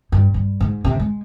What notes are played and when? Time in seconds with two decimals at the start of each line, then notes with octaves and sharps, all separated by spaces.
0.12 G2
0.34 G2
0.61 G#2
0.84 C3
1.00 G#3